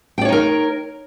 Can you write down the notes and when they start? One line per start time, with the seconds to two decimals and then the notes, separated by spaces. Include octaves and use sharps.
0.18 G5
0.21 D5
0.25 C#5
0.29 D#4
0.32 A#4